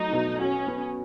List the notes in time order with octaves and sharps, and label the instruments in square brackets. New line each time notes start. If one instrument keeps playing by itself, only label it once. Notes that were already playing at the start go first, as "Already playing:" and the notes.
Already playing: [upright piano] F#3 A3 [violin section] D#4
[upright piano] B2
[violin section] C#4 [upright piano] F#4
[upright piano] B3